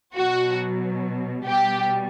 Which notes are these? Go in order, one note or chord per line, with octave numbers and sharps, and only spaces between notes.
B2 F#3 F#4
B2 G3 G4